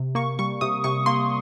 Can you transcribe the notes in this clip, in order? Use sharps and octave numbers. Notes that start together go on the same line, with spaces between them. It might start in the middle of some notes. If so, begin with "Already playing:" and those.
Already playing: C3
A#3 C#6
G3 C#6
C3 D#6
C3 C#6
A#3 C6